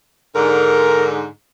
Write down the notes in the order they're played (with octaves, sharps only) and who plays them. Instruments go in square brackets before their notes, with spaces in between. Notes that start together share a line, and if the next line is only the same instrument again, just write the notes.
[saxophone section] G#2 D3 [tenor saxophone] A#4